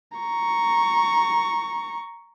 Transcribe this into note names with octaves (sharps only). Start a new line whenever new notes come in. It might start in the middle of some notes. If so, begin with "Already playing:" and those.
A#5 C#6